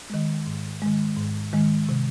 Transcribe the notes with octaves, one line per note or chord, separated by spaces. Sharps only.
D#3 G#3
G#2
D#3 G#3
G#2
D#3 G#3
C3